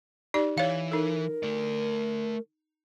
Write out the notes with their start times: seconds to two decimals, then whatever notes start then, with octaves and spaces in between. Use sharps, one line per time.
0.34 D#4 G4 D5
0.58 E3 C#5 F5
0.92 D#4 A4 A#4
1.43 A3 D5